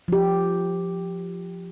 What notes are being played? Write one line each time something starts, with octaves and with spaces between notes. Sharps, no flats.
F3 G4